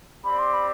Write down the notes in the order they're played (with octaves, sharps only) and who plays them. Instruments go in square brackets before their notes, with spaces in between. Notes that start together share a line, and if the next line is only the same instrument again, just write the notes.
[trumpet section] C4 G4 D5 [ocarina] B5
[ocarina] C6
B5